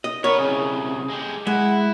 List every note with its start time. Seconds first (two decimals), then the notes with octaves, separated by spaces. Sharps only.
0.04 D#5
0.24 B3 A#4 B4 C#5
0.38 C2 C#3 G#4
1.10 G#3 G4
1.47 G#3 E4 F#5